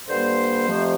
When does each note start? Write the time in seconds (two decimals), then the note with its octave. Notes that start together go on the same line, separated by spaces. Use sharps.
0.09 G2 D3 G3 A#3 C5
0.67 F2 C3 F3 A3